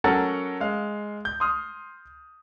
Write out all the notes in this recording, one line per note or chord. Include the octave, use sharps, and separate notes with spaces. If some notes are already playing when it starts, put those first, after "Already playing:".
F#3 C#4 A4 A#4 F#5 A6
G#3 F5
G6
C6 D#6 F6